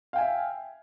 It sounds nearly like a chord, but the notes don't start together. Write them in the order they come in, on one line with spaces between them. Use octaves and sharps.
F5 G5 G#5 E5